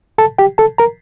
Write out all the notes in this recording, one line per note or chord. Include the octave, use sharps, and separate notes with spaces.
A4 A5
G4 G5
A4 A5
A#4 A#5